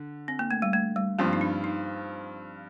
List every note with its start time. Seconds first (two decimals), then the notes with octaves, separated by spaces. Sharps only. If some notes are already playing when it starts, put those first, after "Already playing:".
Already playing: D3
0.28 C4
0.39 A#3
0.51 A3
0.62 G3
0.73 A3
0.96 G3
1.18 G2 F3 A#3 C4 F4
1.33 D#4
1.41 D4
1.64 D#4